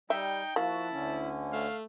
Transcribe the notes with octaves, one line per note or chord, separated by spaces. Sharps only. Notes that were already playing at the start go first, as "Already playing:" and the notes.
G3 D#4 E5 G5
F3 A#3 E4 F#4 A5
D2 D3 C#4
A3 F5